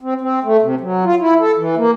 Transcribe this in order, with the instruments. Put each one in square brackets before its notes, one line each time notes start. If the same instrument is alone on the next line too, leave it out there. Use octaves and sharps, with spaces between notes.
[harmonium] C4
C4
A3
C3
F#3
F4
E4
A4
E3
A#3